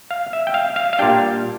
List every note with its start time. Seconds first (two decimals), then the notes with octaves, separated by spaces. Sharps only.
0.11 F5
0.33 E5
0.47 G5
0.54 F5
0.76 F5
0.93 F5
0.99 A#2 G3 D4 G5